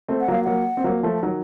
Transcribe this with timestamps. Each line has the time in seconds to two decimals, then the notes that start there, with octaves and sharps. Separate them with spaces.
0.08 A3 C4
0.21 F#5
0.28 F#3 A#3 F5
0.44 F#3 A#3 F#5
0.77 C4
0.84 F#3 A#3
1.03 F3 A3
1.23 D#3 F#3